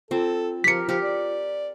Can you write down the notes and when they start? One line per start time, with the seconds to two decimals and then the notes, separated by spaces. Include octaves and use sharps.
0.11 C4 F4 A4
0.64 F3 G4 A#4 B6 C#7
0.89 F3 G4 A#4
1.03 D5